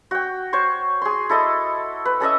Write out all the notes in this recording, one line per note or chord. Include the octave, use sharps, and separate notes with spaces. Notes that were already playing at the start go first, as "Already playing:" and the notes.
F#4 G5
C5 C#5 C#6
G#4 C6
E4 A4 D#5
B4
C#4 A4 D#5 E5